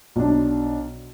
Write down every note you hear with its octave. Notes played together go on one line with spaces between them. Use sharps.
B1 D4